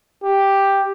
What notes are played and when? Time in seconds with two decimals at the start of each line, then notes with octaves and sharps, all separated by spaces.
0.24 G4